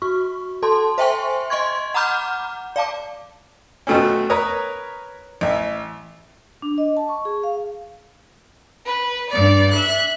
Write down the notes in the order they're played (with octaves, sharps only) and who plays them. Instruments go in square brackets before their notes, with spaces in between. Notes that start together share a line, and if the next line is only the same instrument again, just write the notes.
[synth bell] F#4 C#6
A4 A5 C6
C5 E5 G5 G#5 C6 C#6
D#5 C6 C#6 G#6
F#5 A#5 B5 D6 F6 G6
D5 F5 A5 D6
[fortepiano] B2 F#3 A3 C4 C#4
A#4 B4 C#5 A#5 D#6
A1 E5
[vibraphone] D4
D#5
A5
C#6
G#4
F5
[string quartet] B4
G2 D5
E5 F#6